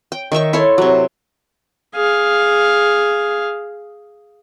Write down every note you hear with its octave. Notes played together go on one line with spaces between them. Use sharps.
G5
D#3 D#4 E5 C#6
E4 A4 C#5 C6
C3 F#3
G#4 F5